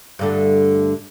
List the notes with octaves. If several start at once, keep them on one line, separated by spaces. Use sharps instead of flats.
G2 D3 A3